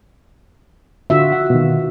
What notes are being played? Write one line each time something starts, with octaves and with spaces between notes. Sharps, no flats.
D3 F4 F#4 E5
F#5
B2 D#3